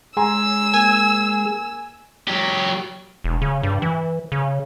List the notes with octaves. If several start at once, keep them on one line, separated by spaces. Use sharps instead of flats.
G#3 G#4 G#5 A#5 C6 E6
A#3 G#5
F#3 G4
E1
C#3
G2
E3
C#3